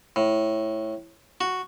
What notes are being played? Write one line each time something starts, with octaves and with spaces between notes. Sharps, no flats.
A2
F#4